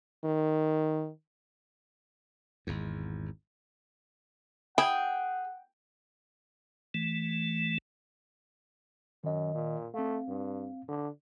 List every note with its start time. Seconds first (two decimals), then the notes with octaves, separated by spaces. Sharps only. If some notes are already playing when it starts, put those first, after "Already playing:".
0.25 D#3
2.67 G#1 E2
4.78 E4 G#4 F#5 G5
6.94 E3 A3
9.24 F#2 D#3 D#5
9.54 A#2
9.94 A3 C4 F5
10.29 G2
10.88 D3